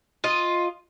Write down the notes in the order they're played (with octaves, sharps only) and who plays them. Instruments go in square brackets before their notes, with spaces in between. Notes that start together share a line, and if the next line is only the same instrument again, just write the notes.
[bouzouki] F4 D#5